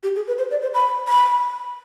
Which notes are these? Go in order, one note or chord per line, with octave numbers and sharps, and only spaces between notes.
G4
G#4
B4
C5
D5
C5
B5
B5